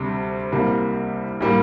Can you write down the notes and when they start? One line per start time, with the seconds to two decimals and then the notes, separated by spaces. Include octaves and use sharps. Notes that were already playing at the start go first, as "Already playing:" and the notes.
Already playing: D2 C3 G3 D4
0.52 C2 C3 G3 A#3
1.41 A2 G3 A#3